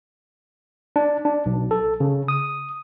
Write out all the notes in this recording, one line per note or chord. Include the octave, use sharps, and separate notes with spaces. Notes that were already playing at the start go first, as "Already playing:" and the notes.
D4
D4
B1
A4
C#3
D#6